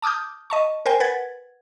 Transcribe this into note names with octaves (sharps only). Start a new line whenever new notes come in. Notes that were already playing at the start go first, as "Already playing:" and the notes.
A5 D6 D#6 F6 G6
D#5 A5 C#6
A#4 C5 G5 G#5
B4 F#5 G#6 A6